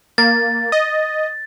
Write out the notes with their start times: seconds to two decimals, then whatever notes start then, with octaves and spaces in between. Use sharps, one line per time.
0.18 A#3 A6
0.72 D#5